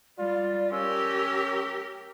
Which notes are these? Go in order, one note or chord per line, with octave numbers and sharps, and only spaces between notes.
G3 F4 D5
C#4 G4 A#4 E6